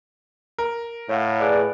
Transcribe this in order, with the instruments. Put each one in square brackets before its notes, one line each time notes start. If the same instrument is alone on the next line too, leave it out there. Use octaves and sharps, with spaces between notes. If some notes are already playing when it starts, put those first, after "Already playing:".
[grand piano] A#4
[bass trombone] A2 [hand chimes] C#5 F5 F#5
[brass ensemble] G#4 B4 D5 [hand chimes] F#6 D7